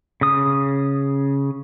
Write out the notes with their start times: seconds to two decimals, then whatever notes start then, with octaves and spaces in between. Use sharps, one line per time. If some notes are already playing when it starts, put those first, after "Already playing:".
0.21 C#3 D#6